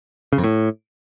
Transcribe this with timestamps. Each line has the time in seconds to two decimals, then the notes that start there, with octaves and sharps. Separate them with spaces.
0.33 C#3
0.38 F2
0.44 A2